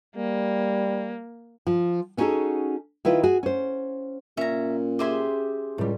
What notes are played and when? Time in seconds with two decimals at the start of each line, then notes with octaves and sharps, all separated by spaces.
0.17 G3 A#3
1.67 F3
2.17 B3 C#4 D#4 F#4 G#4 A4
3.05 D#3 E4 F4 B4
3.23 F#4 G#4
3.43 C#4 C5
4.37 A#2 C#4 E5 A#5
4.99 G4 G#4 C5 E5 G#5 C6
5.78 C#2 A2 G3